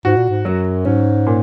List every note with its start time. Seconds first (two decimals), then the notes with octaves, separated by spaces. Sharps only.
0.05 G#2 F#4
0.17 A#2
0.29 G#2
0.45 F#2 F#3
0.85 G#2 C#4
1.27 A#2